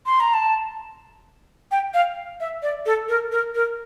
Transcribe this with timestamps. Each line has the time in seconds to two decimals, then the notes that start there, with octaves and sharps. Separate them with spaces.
0.06 C6
0.20 A#5
0.34 A5
1.71 G5
1.94 F5
2.40 E5
2.62 D5
2.86 A4
3.09 A#4
3.32 A#4
3.55 A#4